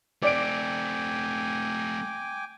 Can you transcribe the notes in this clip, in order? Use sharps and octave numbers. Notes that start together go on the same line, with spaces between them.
A3 C4 D5 G5 G#5 D6 D7